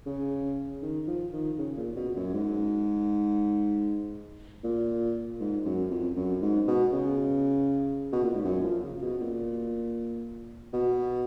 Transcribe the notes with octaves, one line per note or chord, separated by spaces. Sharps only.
C#3
D#3
F3
D#3
C#3
A#2
B2
F#2
G#2
A#2
G#2
F#2
F2
F#2
G#2
B2
C#3
B2
A#2
G#2
F#2
F3
C#3
B2
A#2
B2